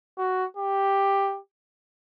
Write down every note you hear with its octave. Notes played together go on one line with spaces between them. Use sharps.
F#4
G4